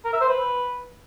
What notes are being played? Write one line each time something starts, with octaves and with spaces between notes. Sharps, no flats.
A#4
E5
C5
B4